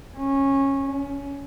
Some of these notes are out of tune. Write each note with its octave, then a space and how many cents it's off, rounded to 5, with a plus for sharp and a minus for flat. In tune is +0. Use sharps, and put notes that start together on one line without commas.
C#4 -15
C#4 +20